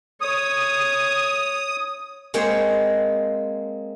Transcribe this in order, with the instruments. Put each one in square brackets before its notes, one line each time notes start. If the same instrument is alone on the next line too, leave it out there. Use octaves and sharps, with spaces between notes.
[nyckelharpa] C#5 [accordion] D#6
[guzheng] G#3 A#3 C4 G#4 C5 C#5